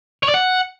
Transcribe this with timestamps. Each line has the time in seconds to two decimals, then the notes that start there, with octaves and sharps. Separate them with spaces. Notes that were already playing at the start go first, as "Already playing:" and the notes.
0.23 C#5
0.28 D5
0.34 F#5